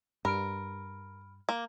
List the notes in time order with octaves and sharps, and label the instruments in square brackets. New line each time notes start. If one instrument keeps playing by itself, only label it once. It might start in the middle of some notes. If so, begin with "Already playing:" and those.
[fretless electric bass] G2 [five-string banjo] A#4 [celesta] B5 F6 D7
[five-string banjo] A#3